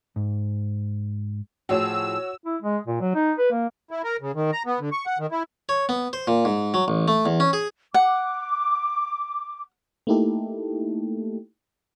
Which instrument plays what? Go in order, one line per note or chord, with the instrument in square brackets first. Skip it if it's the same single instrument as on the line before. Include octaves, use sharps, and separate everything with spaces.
[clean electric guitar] G#2
[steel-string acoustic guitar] A2 F3 G#4 [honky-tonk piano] F#4 C#5 [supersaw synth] E6
[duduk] E4
G#3
A#2
F#3
D#4
B4
A#3
[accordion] E4
A#4
C#3
D#3
A#5
B3
D3
C#6
F#5
D#3
E4
[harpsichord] C#5
B3
C5
A#2
G#2
F#3
A1
A3
E2
C#4
G#4
[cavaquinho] F#5 [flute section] D6
[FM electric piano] A3 A#3 D#4 E4 G4 A4